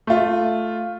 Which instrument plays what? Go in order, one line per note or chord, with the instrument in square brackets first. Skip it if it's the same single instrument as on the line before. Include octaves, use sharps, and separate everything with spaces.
[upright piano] A3 F4